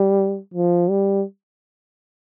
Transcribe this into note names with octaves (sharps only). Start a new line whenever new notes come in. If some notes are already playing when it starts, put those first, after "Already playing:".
Already playing: G3
F3
G3